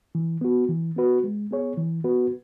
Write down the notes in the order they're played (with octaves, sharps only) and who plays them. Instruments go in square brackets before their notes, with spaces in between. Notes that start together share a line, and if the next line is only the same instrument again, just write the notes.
[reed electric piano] E3
B3 F#4
E3
B3 F#4 B4
G#3
B3 G#4 C#5
E3
B3 F#4 B4